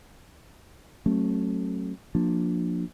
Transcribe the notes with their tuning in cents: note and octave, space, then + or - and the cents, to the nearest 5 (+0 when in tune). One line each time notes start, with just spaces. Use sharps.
F#3 +10 A3 +0 C#4 -35
F3 +15 A#3 +0 D4 +0